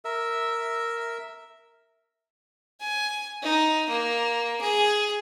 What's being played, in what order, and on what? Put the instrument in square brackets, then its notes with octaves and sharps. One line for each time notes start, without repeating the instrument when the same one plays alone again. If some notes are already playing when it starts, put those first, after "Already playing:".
[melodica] A#4 E5 E6
[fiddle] G#5
D#4
A#3
G#4